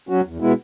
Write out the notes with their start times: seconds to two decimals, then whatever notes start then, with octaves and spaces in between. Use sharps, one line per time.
0.09 F#3 C#4 F#4
0.25 E2
0.40 B2 G#3 B3 E4